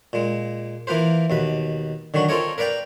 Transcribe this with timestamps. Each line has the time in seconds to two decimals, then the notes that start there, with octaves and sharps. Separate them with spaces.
0.13 A#2 G#3
0.87 E3 A#3 F4 B4 C5
1.30 D#2 B2 B4
2.14 D3 D#3 F#3 F#4
2.29 C4 F4 A4 A#4 C#5 D#5
2.58 A#4 B4 D5 F5 G5